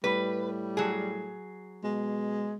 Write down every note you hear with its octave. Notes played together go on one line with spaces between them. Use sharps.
A2 G3 B4
F#3 G#4
B2 G#3